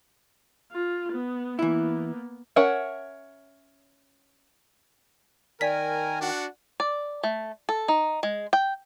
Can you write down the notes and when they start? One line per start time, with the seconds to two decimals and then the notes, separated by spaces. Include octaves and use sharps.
0.72 F4
1.13 B3
1.59 E3 A#3 B3 E4
2.56 C#4 A#4 C#5 E5 F#5
5.61 D#3 A#4 D5 G#5 B6
6.21 D4 F#4 F#5
6.80 D5
7.23 A3
7.69 A4
7.88 D#4
8.23 G#3
8.53 G5